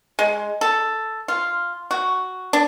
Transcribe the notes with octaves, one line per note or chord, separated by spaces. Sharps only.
G#3
A4
F4
F#4
D4